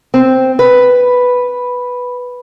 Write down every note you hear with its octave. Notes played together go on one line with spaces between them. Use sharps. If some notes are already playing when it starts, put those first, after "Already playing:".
C4
B4